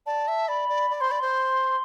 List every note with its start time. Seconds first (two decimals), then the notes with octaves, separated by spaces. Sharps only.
0.06 D5 A5
0.28 E5
0.48 D5 B5
0.69 D5
0.90 D5
1.00 C5 C6
1.09 D5 B5
1.20 C5 C6